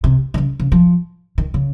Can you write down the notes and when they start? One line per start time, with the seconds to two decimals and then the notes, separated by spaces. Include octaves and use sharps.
0.04 C3
0.34 D#3
0.38 C#3
0.60 C#3
0.72 F3
1.38 D#3
1.54 C#3